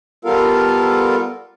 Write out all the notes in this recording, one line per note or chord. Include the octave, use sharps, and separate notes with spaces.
G3 B3 F4 A4 A#4 F5